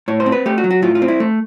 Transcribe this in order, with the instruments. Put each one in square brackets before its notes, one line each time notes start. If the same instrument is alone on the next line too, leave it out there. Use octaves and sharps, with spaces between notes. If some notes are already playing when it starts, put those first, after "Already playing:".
[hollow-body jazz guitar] A2 C#5
C5
C4
B4
A3 G4
F#4
F#3
F#4
A2 F4
F4
C4
E4
A3